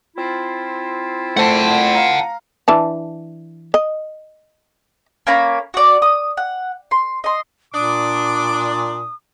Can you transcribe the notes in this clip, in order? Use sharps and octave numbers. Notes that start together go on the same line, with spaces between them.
C4 E4 F4
A3 C5 F#5 A5
F5 A#5
E3 D4 A5
D#5
A#3 C#4 A#5 B5
F#4 D5
D#6
F#5
C6
D#5 C6
A#2 D4 D6 D#6